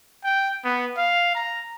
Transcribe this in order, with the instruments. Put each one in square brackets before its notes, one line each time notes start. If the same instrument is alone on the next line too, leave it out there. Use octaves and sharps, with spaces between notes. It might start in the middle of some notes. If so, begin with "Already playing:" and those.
[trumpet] G5
B3
F5
A#5